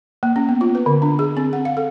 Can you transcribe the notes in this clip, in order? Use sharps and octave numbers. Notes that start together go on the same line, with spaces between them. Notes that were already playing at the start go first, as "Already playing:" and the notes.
A#3
C#4
B3
F4
B4
D3
D4
G#4
C4
F#5
F5
A4